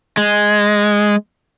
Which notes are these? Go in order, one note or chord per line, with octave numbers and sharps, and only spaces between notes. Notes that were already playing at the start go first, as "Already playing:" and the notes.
G#3